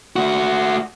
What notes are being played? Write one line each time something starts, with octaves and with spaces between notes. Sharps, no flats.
A3 F#4